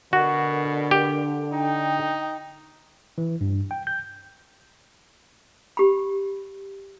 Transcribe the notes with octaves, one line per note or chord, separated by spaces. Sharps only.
B2 D3 F#4 A#4
G4
D#4 G5
E3
G2
G5
G6
G4 B5